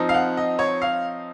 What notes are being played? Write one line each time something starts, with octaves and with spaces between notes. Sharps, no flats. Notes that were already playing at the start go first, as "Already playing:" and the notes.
Already playing: F3 C4 D#4
F5
F#5
D#5
C#5
F5